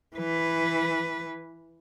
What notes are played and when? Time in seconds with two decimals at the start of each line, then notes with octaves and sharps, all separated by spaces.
0.16 E3 B4